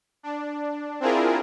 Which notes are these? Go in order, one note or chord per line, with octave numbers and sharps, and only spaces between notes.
D4
C4 D4 E4 F4 G#4 A#4